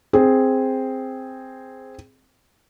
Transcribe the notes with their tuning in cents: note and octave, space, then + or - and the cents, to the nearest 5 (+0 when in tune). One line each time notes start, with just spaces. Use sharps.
C4 +0 G#4 +0